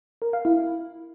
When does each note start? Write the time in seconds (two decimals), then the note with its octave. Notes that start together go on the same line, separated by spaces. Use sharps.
0.22 A#4
0.33 F5
0.45 E4